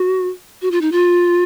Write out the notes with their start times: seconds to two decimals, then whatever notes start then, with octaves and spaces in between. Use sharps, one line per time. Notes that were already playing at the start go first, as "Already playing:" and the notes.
Already playing: F#4
0.62 F#4
0.71 F4
0.81 D#4
0.92 F4